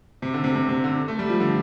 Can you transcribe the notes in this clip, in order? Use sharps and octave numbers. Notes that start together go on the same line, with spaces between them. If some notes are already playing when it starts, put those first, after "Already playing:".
C3
D3
C3
C3
C3
D3
A3
G3
F3
D3